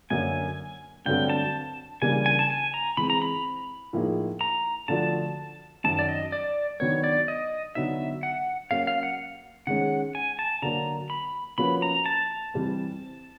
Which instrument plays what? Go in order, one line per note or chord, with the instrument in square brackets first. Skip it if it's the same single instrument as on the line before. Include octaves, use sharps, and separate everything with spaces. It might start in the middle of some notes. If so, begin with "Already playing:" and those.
[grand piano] F#2 D3 F#3 A#3 C#4 [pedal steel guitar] G#5
[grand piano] G2 D3 F#3 A3 C4 [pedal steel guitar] G5
[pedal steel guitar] A5
[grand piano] C#3 E3 G3 A#3 D4 [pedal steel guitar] G#5
[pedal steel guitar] G#5
A5
G#5
A#5
[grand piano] E3 G#3 C4 [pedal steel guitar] B5
[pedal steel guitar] A#5
B5
[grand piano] A2 F3 A#3 D#4 G#4
[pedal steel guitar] A#5
[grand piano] D3 F3 A3 D4 F#4 [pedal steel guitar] A5
[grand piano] F#2 D#3 F#3 [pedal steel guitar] A5
[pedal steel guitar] D5
D#5
D5
[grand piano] D#3 F#3 B3 D4 [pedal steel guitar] C#5
[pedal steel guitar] D5
D#5
[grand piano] D3 F#3 B3 D#4 [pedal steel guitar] E5
[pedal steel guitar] F#5
[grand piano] F#3 A#3 C#4 F#4 [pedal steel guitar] F5
[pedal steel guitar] F5
F#5
[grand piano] D#3 G#3 C#4 [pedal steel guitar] F#5
[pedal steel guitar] G#5
A5
[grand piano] D3 F#3 A#3 D4 [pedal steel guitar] A#5
[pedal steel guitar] B5
[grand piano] F3 A#3 C#4 F#4 B4 [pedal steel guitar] B5
[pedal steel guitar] A#5
A5
[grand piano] E3 G3 C4